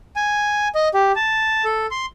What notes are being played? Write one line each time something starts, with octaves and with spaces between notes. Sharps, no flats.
G#5
D#5
G4
A5
A4
C6